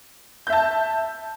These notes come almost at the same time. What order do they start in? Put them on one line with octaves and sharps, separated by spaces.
G6 E5 A5